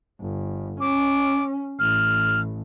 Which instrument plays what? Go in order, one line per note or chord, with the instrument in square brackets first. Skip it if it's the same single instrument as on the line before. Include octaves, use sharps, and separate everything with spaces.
[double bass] G1
[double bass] C#4 [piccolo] D6
[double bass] A1 [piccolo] F6